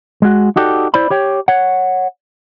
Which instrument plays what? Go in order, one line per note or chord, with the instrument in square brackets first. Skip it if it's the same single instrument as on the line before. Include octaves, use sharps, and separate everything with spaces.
[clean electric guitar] G#3 F#4
D#4 F#4 G4 A4 D5
E4 C5 D5 B5
G4 C#5 G5
C#5 F#5